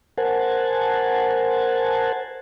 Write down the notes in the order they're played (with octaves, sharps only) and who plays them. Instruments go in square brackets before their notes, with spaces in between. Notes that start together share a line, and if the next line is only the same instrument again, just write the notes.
[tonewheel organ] A#4 C5 F#5 G#5 A5